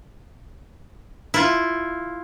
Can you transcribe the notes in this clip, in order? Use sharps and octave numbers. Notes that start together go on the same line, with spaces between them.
E4 F4